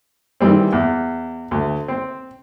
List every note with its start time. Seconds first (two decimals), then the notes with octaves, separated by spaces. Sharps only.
0.40 D#3 E3 G3 C4
0.73 E2
1.51 D2
1.88 C4